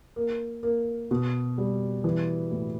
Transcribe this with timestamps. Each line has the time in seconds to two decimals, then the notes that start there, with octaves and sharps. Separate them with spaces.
0.16 A#3
0.63 A#3
1.11 B2
1.58 G3
2.04 E3
2.51 A2